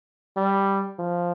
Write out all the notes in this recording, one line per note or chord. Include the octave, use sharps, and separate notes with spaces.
G3
F3